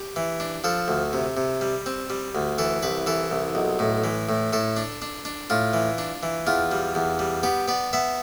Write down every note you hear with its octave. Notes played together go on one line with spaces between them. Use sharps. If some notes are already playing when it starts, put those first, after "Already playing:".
Already playing: G4
E3
D4
F3 A4
D2
C3
C3
G3
C4
G3
D2
E3 A4
C2 B4
E3 A4
C2
B1
A2
E3
A2
A2 A4
D4
D4
D4
A2 F4
E3
D4
E3
E2 F4
G3
E2
G3
B3 G4
B3 D5
B3 E5